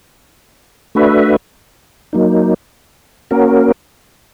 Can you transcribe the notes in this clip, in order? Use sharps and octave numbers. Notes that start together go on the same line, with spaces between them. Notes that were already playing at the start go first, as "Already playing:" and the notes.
A3 D4 F#4 B4 E5
F#3 A#3 D#4
A#3 C#4 F#4 A#4